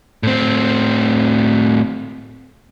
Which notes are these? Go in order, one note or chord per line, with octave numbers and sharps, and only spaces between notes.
A2 C4